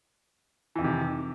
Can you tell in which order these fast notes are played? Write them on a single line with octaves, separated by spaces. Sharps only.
E3 F2 D#3 C3